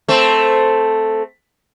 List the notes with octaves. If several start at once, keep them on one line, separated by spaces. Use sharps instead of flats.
A3 C4